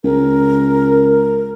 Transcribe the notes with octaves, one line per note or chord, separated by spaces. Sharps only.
C#2 A#4